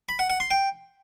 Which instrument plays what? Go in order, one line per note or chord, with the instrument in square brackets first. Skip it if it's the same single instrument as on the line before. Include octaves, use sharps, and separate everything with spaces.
[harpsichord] B5
F#5
F#5
C6
G5